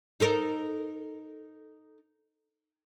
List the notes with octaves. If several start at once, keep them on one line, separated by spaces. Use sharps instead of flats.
D#4 A4 A#4